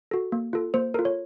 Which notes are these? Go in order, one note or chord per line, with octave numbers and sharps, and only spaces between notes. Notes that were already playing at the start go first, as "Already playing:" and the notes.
F#4 A4
A#3
F4 A4
A#3 C5
F4 A4 A#4
C#5